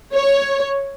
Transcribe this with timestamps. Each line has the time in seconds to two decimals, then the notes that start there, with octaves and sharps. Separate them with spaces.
0.13 C#5